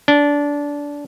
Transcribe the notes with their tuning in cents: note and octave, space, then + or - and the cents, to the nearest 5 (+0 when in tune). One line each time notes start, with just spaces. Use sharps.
D4 -20